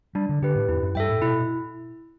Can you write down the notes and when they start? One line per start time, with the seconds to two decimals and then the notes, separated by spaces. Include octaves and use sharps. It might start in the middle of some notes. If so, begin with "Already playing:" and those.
0.15 G3 D4
0.29 D3
0.42 D3 G4 B4
0.55 A2
0.68 E2 E4
0.82 F#2
0.95 G2 A4 E5 G5
1.09 A2
1.22 B2 E4